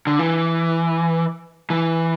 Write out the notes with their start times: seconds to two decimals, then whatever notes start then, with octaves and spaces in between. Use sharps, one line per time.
0.07 D3
0.19 E3
1.70 E3